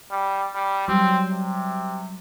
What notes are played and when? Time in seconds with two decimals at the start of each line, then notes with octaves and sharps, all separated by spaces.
0.11 G3
0.55 G3
0.88 F#3 G3 C4
1.31 C3